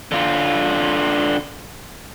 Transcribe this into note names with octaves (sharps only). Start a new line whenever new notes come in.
D3 F4